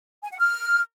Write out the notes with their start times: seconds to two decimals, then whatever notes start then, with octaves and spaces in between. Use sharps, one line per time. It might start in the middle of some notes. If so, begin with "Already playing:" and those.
0.24 G#5
0.32 F#5
0.40 F6